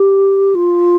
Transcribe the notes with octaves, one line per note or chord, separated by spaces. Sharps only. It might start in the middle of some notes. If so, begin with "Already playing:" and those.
Already playing: G4
F4